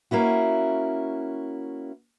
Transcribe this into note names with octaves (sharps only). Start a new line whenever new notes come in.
A#3 C#4 E4 F#4